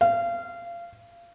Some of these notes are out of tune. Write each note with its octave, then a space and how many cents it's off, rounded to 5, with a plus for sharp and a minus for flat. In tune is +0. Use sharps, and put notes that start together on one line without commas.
F5 -25